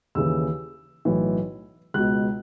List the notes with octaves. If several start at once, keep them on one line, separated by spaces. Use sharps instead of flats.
D#2 C#3 E3 E6
B1 A2 E3
C#2 B2 F#6